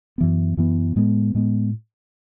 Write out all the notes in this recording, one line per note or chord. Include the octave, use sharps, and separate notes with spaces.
F#2 E3 B3
F#2 E3 B3
A2 G#3 B3
A2 G#3 B3